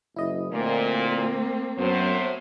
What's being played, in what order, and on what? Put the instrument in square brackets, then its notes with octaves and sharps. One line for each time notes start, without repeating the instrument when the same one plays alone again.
[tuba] F#1 [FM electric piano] E4 D#5
[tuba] D2 [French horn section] A#2 [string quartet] A#3 C4
[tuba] F#2 [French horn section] A2 F#3 C5 [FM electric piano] B3